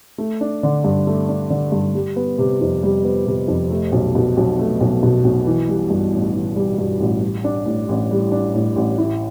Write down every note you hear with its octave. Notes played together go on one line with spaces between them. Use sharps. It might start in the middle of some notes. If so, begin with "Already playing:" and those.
A3
D4
D3
G2
A3
D4
D3
G2
G3
B3
C3
F2
G3
B3
C3
F2
A3
B1
B2
B1
A3
B1
B2
B1
E3
G3
G2
A1
E3
G3
G2
A1
G3
D4
A2
A1
G3
D4
A2
A1
E4